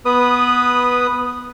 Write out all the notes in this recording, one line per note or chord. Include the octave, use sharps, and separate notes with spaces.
B3 B4 D#6